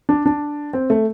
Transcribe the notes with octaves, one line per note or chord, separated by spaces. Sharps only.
D4
D4
C4
A3